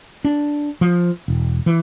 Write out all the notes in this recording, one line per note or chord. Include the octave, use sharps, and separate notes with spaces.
D4
F3
E1
E3